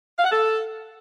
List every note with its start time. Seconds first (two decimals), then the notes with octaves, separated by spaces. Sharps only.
0.18 F5
0.24 F#5
0.30 A4